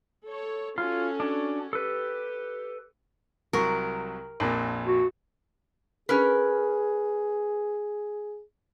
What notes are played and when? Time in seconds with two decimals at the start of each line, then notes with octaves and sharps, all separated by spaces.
0.25 A4 C#5
0.78 C#4 F4 F#4 A4
1.20 D4
1.73 G4 A4 B4
3.53 C2 F#3 A#4 C#6
4.40 A#1 F2 A#2
4.86 F#4
6.09 C#4 G#4 A#4 B4